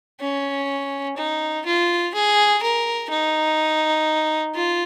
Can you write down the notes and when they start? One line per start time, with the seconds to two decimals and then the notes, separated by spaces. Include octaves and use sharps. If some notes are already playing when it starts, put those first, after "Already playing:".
0.21 C#4
1.17 D#4
1.66 F4
2.14 G#4
2.62 A#4
3.10 D#4
4.55 F4